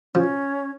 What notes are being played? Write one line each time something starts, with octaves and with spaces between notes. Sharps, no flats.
F3 C#4